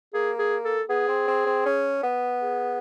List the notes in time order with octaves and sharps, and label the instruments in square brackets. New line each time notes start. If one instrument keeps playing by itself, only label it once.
[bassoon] A#3 [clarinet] G#4
[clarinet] G#4
A4
[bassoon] B3 [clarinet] G#4
[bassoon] C4
C4
C4
C#4
B3
[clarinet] G#4